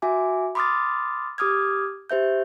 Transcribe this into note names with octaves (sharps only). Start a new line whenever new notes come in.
F#4 E5 G#5 D6
B5 C6 D6 D#6 F6 A6
G4 D6 D#6 F6 G#6
G4 C5 E5 G6